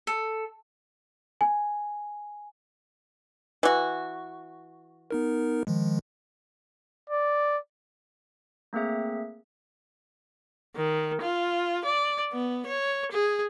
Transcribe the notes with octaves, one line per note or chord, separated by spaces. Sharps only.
A4
G#5
E3 F#4
B3 D#4 A#4
D#3 F3 G#3
D5
A3 A#3 C4 G#4 E5
D#3
F4
D5
B3
C#5
G#4